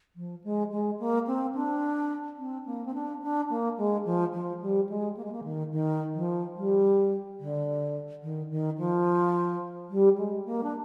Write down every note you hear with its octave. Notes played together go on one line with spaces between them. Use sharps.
F3
G#3
G#3
A#3
C4
D4
C4
A#3
C4
D4
D4
A#3
G#3
F3
F3
G3
G#3
A#3
G#3
A#3
D#3
D#3
F3
G3
D3
D#3
D#3
F3
G3
G#3
A#3
D4